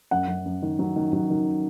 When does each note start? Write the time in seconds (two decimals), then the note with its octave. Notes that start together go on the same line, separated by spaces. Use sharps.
0.11 F#2 F#5
0.28 F#2
0.46 F#2
0.62 D#3
0.79 F#3
0.96 D#3
1.13 F#3
1.30 D#3